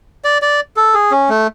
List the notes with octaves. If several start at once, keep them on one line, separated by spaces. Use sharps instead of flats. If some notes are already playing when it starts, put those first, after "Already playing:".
D5
D5
A4
G#4
C#4
A3